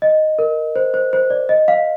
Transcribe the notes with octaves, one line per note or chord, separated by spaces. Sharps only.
D#5
A#4
C5
C5
C5
D5
D#5
F5